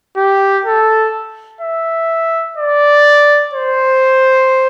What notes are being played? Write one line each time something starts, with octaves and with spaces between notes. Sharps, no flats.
G4
A4
E5
D5
C5